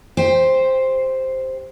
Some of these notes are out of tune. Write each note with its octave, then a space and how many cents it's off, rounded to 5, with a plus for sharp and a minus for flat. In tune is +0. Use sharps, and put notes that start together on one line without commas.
G4 +0 C5 +0 G5 +25